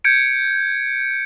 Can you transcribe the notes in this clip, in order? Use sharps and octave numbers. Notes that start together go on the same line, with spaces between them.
G6 G#6 C#7 D7